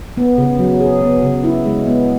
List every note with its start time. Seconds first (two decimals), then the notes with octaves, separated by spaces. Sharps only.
0.17 B3
0.38 C#3
0.59 F#3
0.80 G#4
1.01 B3
1.23 C#3
1.44 E4
1.66 G#3
1.87 B3